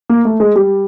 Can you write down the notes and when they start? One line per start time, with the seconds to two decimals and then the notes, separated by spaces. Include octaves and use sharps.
0.09 A#3
0.25 A3
0.40 G#3
0.56 G3